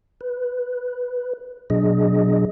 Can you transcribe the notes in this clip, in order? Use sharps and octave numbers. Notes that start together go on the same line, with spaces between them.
B4
B2 F#3 D4 G#4 D#5